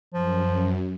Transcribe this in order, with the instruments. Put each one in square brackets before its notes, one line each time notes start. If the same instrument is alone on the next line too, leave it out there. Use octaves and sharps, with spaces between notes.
[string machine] F#2 [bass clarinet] F3